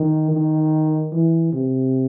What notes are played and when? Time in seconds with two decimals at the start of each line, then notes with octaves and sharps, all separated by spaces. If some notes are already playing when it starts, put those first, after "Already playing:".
Already playing: D#3
0.31 D#3
1.12 E3
1.52 C3